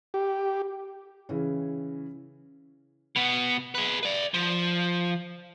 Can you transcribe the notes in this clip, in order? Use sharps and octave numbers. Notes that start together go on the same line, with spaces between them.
G4
C#3 E3 C#4
B2 B3
G#4 B4
B4 D5
F3